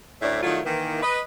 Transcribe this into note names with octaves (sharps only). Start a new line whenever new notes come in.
D2 A2 C#4 D4 D5 E5
D#3 F#3 G3 A3 E4 F4
D#3 E3 A#3
B4 D#5